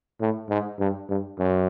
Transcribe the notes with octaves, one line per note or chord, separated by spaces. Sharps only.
A2
G#2
G2
G2
F#2